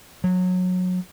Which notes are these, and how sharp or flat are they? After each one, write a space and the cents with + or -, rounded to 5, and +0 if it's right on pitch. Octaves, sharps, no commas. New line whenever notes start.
F#3 -20